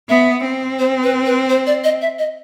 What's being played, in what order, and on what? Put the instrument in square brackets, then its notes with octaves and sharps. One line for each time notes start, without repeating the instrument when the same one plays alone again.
[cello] B3 [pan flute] E5
[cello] C4
[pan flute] C5
B4
B4
C5
D5
D#5
E5
D#5